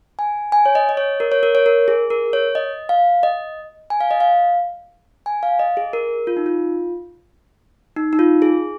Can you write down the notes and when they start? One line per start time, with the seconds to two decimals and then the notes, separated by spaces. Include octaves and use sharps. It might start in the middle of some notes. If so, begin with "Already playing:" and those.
0.19 G#5
0.52 G#5
0.66 C#5
0.75 D#5
0.89 D#5
0.97 C#5
1.20 A#4
1.32 C#5
1.43 A#4
1.55 C#5
1.66 A#4
1.88 G#4
2.10 A#4
2.33 C#5
2.55 D#5
2.89 F5
3.23 D#5
3.90 G#5
4.01 F5
4.11 D#5
4.20 F5
5.26 G#5
5.43 F5
5.59 D#5
5.77 G#4
5.93 A#4
6.27 F4
6.37 D#4
6.46 F4
7.96 D#4
8.13 D#4
8.19 F4
8.42 G#4